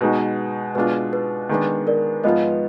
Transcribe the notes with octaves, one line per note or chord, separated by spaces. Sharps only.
B2 G#3 D#4 F#4 B4
B2 G#3 D4 F4 B4
B4
D#3 G#3 B3 D4
A#4 D5
G#2 F3 B3 F4 B4 D#5